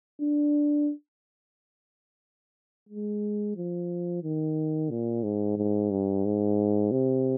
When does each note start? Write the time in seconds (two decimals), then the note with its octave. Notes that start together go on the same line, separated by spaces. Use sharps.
0.21 D4
2.89 G#3
3.57 F3
4.23 D#3
4.90 A#2
5.23 G#2
5.57 G#2
5.91 G2
6.25 G#2
6.92 C3